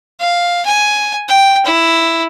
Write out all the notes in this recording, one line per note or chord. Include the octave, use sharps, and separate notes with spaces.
F5
G#5
G5
E4